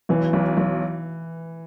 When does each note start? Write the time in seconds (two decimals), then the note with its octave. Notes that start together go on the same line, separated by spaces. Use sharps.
0.09 B1 E3
0.33 B1
0.57 B1